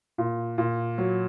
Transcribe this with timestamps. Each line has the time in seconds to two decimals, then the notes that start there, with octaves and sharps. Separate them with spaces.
0.18 A#2
0.58 A#2
0.98 F#3